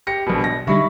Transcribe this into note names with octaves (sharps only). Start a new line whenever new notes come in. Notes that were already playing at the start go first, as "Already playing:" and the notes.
G4 A#6 C#7
A#1 B2
A#6
D3 G3 D#4 E5 B5 C#6